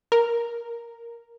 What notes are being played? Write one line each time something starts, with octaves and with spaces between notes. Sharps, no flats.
A#4